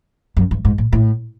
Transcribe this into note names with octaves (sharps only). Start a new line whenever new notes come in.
F#2
G2
G#2
A2
A2